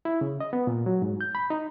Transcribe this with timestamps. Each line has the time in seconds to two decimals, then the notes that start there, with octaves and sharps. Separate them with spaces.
0.05 E4
0.21 C#3
0.40 D#5
0.53 B3
0.67 A#2
0.86 F#3
1.02 G#2
1.21 G6
1.35 B5
1.50 D#4